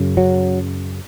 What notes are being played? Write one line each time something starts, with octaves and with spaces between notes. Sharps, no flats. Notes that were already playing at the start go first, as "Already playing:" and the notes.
Already playing: F#2 C#3
F#3